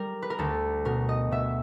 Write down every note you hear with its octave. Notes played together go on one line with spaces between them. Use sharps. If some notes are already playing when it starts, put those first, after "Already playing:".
Already playing: G3 A#4
B4
A#4
D2 A4
B2 A#4
D#5
B2 E5